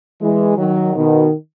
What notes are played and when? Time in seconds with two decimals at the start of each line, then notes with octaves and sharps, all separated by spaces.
0.20 E3 G#3
0.57 D#3 F#3
0.94 B2 D#3